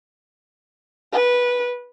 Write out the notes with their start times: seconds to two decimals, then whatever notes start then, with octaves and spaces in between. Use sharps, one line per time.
1.12 B4